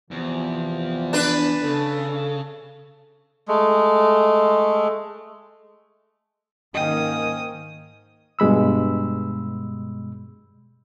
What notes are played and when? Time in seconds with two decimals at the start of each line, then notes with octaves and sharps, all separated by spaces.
0.11 E2 C3 F3
1.13 D4 B4
1.64 C#3 A4
3.48 G#3 A3
6.75 G#2 D#3 A#3 C#4 D#5 G5 D#6
8.39 G2 B2 G#3 B5 E6